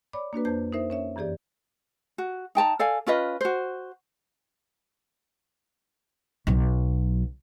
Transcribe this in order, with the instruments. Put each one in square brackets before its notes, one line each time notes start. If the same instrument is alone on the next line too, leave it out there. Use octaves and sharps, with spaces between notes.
[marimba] C#5 D5 B5 D6
A#3 D4 F#4 B4
F2 C5 A5 G6
D#4 A#4 C5 E5
C#4 C#5 E5
F#2 E3 G4 G#4 D5
[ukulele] F#4
D#4 G5 A5 A#5
A4 D5 F5 G#5
C#4 F4 B4 D#5
F#4 C5
[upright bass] B1 F#3